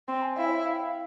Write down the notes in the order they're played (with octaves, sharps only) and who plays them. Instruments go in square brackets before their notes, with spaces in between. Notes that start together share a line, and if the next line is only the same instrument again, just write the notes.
[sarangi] C4 [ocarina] C6
[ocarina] G#5
[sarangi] E4 [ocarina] F5
[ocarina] C#5
E5
F5
G5
F5